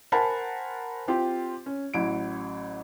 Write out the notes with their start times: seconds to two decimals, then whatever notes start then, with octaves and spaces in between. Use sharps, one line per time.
0.12 A#4 C5 F#5 G#5 A5 B5
1.08 C4 F4 G4
1.66 C#4
1.94 A1 F#3 E4 D7